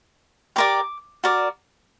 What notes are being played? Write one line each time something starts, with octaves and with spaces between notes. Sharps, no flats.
G4 A#4 D5 D6
F#4 A#4 D5